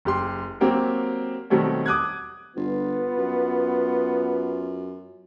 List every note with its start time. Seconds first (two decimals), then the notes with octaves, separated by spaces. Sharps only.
0.05 F#1 G4 C6
0.61 F#3 A#3 C4 G4 A#4
1.50 B2 D#3 F#3 G3 A3 C4
1.86 D6 D#6 F#6 G#6
2.56 G1 B3 F4
3.18 F#2